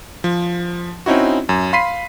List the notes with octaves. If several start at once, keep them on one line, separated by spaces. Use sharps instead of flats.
F3
C4 C#4 D#4 E4 F#4
F#2
F5 B5 C6 B6 C7 D#7